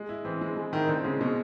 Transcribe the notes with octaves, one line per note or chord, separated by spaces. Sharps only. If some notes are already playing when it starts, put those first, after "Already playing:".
Already playing: G#3
E4
E3 C4
G#3
G#3
D#3 E4
D3 C4
C#3 G#3
B2 G#3